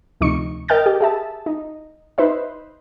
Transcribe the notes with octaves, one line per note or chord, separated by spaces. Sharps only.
D2 C3 F3 D#4 C#6 C#7
A#4 D#5 G5 F6 G6 A6
G4
G#4 E5 A5
D#4
D#4 B4 C5 E5